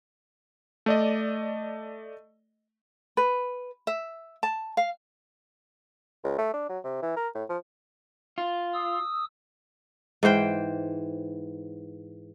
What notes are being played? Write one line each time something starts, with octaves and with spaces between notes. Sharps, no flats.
A3 D5 D#5
B4
E5
A5
F5
C#2
A3
D4
F#3
C3
E3
A#4
A2
F3
F4
D#6 E6
G#2 E3 C5 G5